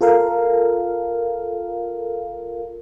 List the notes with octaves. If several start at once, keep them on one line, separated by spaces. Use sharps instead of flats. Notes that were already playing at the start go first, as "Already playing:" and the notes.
F4 A4 A#4 F5